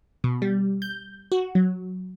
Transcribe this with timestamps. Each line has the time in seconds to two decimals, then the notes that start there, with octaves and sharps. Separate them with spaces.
0.24 B2
0.42 G3
0.82 G6
1.32 F#4
1.55 F#3